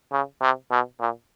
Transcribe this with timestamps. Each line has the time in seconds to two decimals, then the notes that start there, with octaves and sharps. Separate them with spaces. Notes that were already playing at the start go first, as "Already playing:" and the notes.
0.12 C#3
0.41 C3
0.71 B2
1.00 A#2